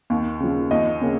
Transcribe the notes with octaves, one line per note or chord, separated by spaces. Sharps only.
D#2
C#3 F3
D#2 D#5
C#3 A#3 C#4